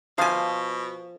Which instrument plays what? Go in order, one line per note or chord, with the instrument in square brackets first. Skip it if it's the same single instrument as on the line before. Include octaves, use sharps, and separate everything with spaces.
[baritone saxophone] B2 [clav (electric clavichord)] F3 [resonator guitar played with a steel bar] F5 G#5